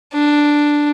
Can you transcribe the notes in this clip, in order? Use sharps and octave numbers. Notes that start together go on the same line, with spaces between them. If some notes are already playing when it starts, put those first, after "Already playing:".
D4